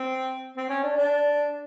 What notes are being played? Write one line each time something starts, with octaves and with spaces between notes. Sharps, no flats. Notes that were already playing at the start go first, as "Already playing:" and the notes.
Already playing: C4
C4
C#4
D4
D4